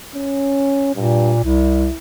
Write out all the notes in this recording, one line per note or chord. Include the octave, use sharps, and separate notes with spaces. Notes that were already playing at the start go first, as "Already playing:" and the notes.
C#4
G2 A#2
C2 E4